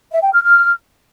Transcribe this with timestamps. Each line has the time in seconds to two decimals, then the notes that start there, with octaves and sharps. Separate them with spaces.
0.12 E5
0.23 G5
0.33 F6
0.44 F6